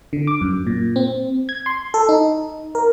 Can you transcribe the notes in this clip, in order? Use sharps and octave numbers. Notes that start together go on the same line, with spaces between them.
D3
D6
F#2
A#2
C4
G#6
C6
A4
D#4
A#4